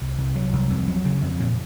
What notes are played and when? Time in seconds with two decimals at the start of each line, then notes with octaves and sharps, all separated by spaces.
0.01 C2
0.18 C2
0.35 F#3
0.53 C2
0.70 F2
0.88 F#3
1.05 C#3
1.22 F2
1.40 A#2